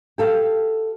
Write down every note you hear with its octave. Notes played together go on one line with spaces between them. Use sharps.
G4 A4 F5